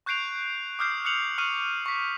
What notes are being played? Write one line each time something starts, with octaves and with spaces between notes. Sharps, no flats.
C#6 F#6 G6 C7 D7 F7
D6 D#6 F6 G6 C7
D#6 F#6 C#7 F7 F#7
C#6 D#6 F6 C7 D#7
C#6 B6